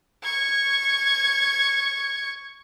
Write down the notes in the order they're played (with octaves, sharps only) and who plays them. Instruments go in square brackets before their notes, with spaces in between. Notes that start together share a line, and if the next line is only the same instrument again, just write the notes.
[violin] C#6 G#6